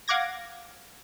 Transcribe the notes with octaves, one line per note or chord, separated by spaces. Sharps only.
F5 F#5 D6 G#6 A#6